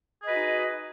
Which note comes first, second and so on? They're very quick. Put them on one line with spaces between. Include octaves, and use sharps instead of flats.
G#4 D#5 B4 F#4 D#4